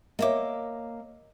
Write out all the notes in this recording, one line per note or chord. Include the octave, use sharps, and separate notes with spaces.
A#3 C#5 D#5 E5 D6